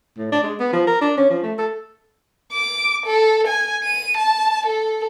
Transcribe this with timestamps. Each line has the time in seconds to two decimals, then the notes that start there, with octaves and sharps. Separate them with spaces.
0.18 A2
0.32 D4
0.43 G#3
0.60 B3
0.73 F3
0.87 A#4
1.01 D4
1.18 C#4
1.30 F3
1.43 A3
1.58 A4
2.53 D6
3.06 A4
3.47 G#5
3.84 D#7
4.17 A5
4.66 A4